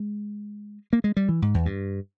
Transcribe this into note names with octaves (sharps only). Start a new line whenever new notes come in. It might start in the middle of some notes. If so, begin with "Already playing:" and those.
Already playing: G#3
A#3
G#3
G3
E3
G#2
E2
G2